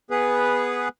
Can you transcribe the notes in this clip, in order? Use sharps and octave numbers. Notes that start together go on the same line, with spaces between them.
B3 G#4 B4